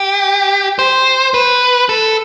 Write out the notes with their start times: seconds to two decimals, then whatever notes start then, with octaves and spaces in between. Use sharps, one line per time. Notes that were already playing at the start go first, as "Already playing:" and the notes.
Already playing: G4
0.79 C5
1.34 B4
1.89 A4